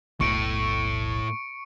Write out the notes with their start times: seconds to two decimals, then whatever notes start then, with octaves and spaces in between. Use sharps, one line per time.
0.21 E1 B1 A2 C#6 C#7 D7